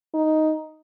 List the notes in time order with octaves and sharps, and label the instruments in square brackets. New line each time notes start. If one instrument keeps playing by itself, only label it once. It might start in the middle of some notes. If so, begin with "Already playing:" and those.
[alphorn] D#4